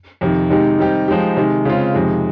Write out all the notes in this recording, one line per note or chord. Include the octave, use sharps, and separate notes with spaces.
F2 C3 D#3
C3 D#3 G#3 D#4 G4
D#3 G3 C4 D#4 G4
F3 G#3 D#4 G4
C3 D#3 G#3
C#3 G#3 C4 F4
F2 C3 D#3 G#3